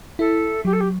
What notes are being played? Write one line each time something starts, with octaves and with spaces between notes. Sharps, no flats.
E4 A4
F#3 G4
A4
G4